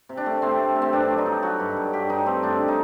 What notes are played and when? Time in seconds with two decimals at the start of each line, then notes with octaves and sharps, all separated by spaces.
0.09 C3
0.17 D4
0.26 A3
0.42 C3 C4
0.59 A3
0.76 C3
0.82 C4
0.93 G2 D4
1.10 F#3
1.18 D#4
1.26 F#3
1.43 F#3 F#4
1.60 G2
1.77 G2
1.93 G2 G4
2.10 G2 D#4
2.26 A3 C4
2.43 G2 D4
2.68 D#4